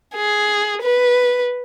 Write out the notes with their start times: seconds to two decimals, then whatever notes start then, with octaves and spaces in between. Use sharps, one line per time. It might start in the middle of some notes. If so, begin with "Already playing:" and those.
0.15 G#4
0.82 B4